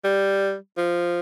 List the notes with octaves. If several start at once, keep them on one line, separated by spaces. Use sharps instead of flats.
G3
F3